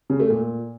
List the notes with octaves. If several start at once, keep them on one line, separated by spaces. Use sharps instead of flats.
C#3
A3
A#2